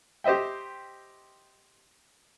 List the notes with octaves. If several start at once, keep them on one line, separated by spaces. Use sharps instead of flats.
G4 C5 D#5 E5 G5